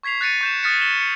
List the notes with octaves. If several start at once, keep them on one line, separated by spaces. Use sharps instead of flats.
C#6 G#6 B6 C7 F7
F#6 A6 C#7 D#7
C#6 G6 E7
D#6 F6 A6 B6 C#7
A6 E7 G7
C#7